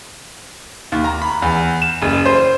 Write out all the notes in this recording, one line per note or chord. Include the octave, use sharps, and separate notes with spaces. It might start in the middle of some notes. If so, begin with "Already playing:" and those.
D#2
A#5
B5
E2
E7
F#1
C5